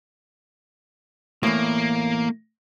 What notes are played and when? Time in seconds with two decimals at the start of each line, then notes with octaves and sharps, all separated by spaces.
1.43 E2 A2 A#3